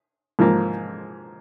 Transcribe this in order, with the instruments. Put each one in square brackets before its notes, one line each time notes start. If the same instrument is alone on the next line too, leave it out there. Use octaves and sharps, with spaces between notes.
[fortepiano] G#2 F3 A#3